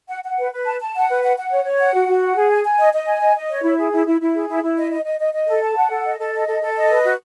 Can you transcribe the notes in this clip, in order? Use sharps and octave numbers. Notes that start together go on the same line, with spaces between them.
F#5
F#5
B4
B4
A5
A5
F#5
B4
F#5
F#5
C#5
C#5
F#5
F#4
F#4
F#5
G#4
G#5
G#5
D#5
D#5
G#5
D#5
D#5
C#5
E4
G#4
E4
E4
E4
G#4
E4
E4
D#5
D#5
D#5
D#5
D#5
A4
A5
F#5
A4
D#5
A4
D#5
A4
A4
D#5
B4
F#4